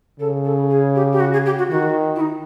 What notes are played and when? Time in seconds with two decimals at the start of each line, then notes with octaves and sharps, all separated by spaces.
0.20 C#3 A4
0.45 A4
0.70 G#4
0.95 G4
1.12 G4
1.20 F#4
1.33 G#4
1.46 G4
1.58 F#4
1.70 D#3 F#4
2.16 E4
2.21 D#4